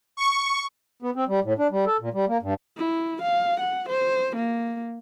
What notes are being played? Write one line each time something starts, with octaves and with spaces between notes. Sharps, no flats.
C#6
B3
C4
G3
A2
D4
G3
A4
A#2
G3
A#3
G2
E4
F5
F#5
C5
A#3